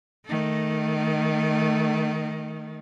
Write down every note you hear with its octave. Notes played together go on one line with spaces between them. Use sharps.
D#3 A3